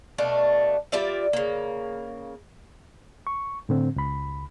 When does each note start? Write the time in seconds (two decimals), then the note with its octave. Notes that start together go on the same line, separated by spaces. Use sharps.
0.18 B2 A3 D4 F5
0.92 G3 F4 D5 E5
1.33 C#3 A#3
3.27 C#6
3.69 A2 D3 C4
3.96 C#2 B5